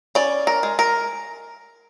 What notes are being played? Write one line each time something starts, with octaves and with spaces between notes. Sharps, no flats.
C#4 D5
A#4
G#3
A#4